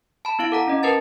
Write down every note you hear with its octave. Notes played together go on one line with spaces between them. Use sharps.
A5 B5
B3 E4 F5 D7
A4 F#5 A#5
C#4 D#5
A#4 B4 A5 A6